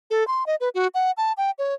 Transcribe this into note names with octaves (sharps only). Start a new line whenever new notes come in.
A4
C6
D#5
B4
F#4
F#5
A5
G5
C#5